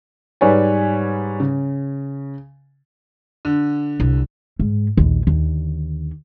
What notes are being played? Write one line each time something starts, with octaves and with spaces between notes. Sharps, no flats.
G#2 G3 B4 C#5 G#5
C#3
D3
C2
G#2
A#1 D#2
D#2 D3